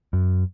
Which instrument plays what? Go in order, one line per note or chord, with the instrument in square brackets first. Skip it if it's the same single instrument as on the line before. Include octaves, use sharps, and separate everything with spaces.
[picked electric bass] F#2